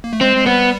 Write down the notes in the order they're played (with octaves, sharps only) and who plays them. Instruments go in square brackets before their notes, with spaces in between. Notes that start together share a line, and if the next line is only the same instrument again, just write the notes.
[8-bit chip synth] A#3
A3
[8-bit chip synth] G#3 [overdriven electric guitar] C4
[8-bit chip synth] G#3
[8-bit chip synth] G3 [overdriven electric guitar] B3